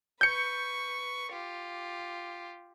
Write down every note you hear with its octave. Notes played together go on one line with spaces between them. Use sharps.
B4 C#6 G6 C#7
F4 G4